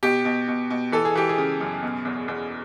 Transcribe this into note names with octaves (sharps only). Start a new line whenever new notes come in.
B2 G4
B2
B2
B2
E3 A4
G#4
E3 G4
G#4
C#3
F#2
B2
E2
E2